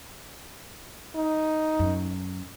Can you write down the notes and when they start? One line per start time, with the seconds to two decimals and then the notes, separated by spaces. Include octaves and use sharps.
1.15 D#4
1.79 F#2